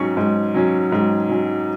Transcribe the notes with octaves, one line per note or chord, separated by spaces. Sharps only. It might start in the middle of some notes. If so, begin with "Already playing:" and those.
Already playing: G#2 F#3 C#4 C#6
G#2
F#3 C#4
G#2
F#3 C#4